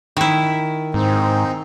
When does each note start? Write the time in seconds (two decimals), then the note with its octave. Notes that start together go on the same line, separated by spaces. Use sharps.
0.17 D#3 E4
0.94 G#2 C4 D#4